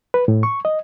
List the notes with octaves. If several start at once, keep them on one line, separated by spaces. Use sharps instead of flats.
B4
A2
C#6
D#5